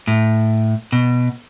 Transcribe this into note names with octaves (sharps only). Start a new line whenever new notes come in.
A2
B2